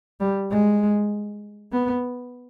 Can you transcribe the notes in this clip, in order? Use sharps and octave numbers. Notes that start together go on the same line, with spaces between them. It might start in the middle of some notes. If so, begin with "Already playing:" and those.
G3
G#3
B3